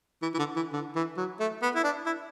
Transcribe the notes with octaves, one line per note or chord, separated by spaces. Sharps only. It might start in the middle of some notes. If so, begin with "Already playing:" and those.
E3
E3
D3
E3
D3
E3
F#3
A3
B3
E4
D4
E4